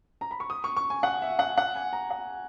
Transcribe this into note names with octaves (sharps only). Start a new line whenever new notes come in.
A#5
B5
C#6
D#6
C#6
C#6
G#5
F#5
E5
F#5
F#5
G#5
A#5
F#5